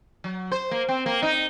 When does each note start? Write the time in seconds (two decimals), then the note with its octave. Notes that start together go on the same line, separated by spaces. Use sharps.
0.24 F#3
0.52 C5
0.71 A#3
0.89 C4
1.06 A#3
1.23 D#4